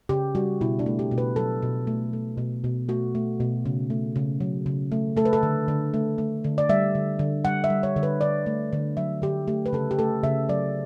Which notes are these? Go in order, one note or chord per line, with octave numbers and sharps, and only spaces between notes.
C#3 G4
G3 F#4
B2 E4
D4
A3
G4
B2
B4
F#3 A4
B2
A3
A3
B2
B2
A3 F#4
A3
B2
C#3
A3
C#3
F#3
C#3
A3
A3 A4
B4
A4
D3
D3
A3
A3
D3
D5
G3 E5
D3
D3
G3 F#5
E5
G3
C#5
D3
B4
D3 D5
A3
D3
F#3 E5
D3 G4
A3 G4
B4
C#3 A4
G4
A3 A4
C#3 E5
F#3 D5